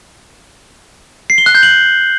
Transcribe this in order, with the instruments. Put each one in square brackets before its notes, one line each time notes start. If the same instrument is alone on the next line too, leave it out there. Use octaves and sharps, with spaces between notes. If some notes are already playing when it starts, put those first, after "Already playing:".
[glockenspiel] C7
G7
F#6
G6
F#7